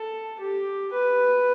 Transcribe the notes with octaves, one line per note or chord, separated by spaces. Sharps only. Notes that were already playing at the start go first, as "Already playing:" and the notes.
Already playing: A4
G4
B4